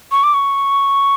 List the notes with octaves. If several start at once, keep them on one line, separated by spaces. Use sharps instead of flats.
C#6
D6
C#6